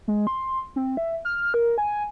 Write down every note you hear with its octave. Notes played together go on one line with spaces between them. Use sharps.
G#3
C6
C4
E5
F6
A#4
G#5